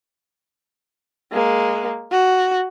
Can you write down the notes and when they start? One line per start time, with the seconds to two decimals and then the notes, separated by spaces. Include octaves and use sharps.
1.32 G#3 A#3
2.12 F#4